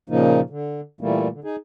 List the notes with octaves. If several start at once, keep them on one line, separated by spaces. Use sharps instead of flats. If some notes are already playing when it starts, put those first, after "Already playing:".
A#2 C#3 F3 A#3 D#4
D3
A#2 E3 G3 A3 A#3
D3
D#4 G#4